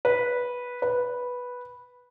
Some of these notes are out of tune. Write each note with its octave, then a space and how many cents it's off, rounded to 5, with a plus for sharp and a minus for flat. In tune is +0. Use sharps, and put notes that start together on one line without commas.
B4 -10
B4 -5